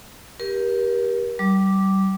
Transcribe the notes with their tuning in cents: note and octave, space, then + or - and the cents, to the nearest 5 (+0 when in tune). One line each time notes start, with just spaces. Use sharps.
G4 +0 A#4 +35
G3 -30 D6 +0